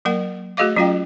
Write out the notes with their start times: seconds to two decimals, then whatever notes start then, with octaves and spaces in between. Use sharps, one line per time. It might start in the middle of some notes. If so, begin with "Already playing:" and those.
0.05 F#3 A#3 A#4 F#5
0.57 A3 F#4 G#4 D#5 F5 D6
0.76 F#3 C#4 F4 D#5 F5 G5